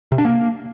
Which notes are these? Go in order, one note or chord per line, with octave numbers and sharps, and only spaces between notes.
C3
D4
A#3